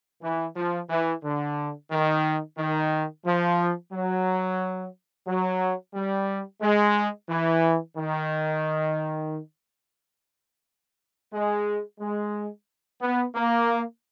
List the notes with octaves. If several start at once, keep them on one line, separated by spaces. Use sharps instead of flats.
E3
F3
E3
D3
D#3
D#3
F3
F#3
F#3
G3
G#3
E3
D#3
G#3
G#3
B3
A#3